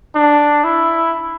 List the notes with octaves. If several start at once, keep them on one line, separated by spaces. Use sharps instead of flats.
D4
E4